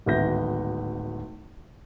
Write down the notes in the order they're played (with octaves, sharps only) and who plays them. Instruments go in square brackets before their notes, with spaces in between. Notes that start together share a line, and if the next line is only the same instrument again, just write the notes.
[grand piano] D1 G#1 B3 E5 G6 A#6